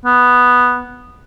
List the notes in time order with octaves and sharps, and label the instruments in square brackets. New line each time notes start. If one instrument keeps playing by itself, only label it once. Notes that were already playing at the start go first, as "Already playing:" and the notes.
[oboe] B3